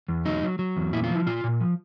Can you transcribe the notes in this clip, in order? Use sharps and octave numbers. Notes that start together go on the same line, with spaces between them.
E2
F#3 D#4
F#3
F#3
E2
A#2 E4
F4
F3
E4
A#2 F4
A#2
F3